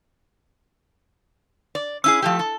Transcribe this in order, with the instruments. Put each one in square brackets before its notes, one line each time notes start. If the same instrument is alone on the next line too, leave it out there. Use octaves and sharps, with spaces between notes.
[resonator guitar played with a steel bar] D5
[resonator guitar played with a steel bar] C#4 E4 G#4 [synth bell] E6
[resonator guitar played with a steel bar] F3 A3 G4
A4